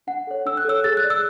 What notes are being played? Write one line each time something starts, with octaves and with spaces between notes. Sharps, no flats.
D4 F#5
A4 C#5
D4 E6
F#6
A4 C#5 E6
G#4 A6
F#6
D5
E6